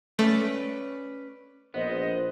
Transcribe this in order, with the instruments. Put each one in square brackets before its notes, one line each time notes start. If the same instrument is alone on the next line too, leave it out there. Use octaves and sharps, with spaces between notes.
[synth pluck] A3 [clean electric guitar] C#4 B4 D5
[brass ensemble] A#1 C5 D#5 [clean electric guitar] B3